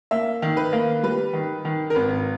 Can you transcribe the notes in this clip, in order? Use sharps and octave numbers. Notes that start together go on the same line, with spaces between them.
A#3 E5
D#3
B4
A#3
G3 B4
D#3
D#3
A#4
G#1 B4